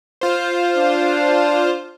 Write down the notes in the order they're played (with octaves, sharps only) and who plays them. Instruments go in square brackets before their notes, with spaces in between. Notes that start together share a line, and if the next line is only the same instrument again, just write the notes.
[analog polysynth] F4 C5
[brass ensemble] D4